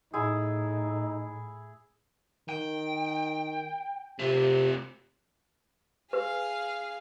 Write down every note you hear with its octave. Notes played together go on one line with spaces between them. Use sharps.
A2 D#4 E4 G#4
D#3 G5
C3 A3 F4
G#4 B4 F5